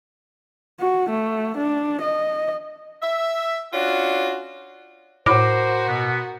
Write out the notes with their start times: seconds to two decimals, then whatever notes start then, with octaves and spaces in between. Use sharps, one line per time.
0.80 F#4
1.09 A3
1.57 D4
2.02 D#5
3.02 E5
3.73 C#4 D4 F4 F#4
5.26 A2 F#4 A#4 C5 D6
5.87 B2 B3